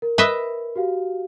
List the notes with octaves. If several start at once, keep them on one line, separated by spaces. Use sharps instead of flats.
A#4
B4 D#5 E5
F#4 G4 F5